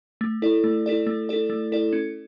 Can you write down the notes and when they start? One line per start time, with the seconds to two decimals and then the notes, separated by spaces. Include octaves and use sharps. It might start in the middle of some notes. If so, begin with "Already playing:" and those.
0.21 A3
0.42 E4 A4 D5
0.64 A3
0.86 E4 A4 D5
1.07 A3
1.29 E4 A4 D5
1.50 A3
1.72 E4 A4 D5
1.93 C#4